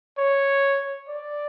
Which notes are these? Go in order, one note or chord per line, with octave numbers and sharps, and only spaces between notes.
C#5
D5